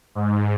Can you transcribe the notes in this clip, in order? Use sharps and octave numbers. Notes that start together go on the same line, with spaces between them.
G#2